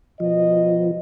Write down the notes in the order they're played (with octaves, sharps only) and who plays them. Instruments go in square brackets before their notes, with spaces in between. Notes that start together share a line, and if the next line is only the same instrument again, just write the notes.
[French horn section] B2 D#5 [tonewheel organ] F3